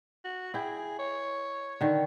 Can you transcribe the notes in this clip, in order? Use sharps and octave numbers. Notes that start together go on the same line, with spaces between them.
F#4
E4 G#4 G5
C#5
D3 D#3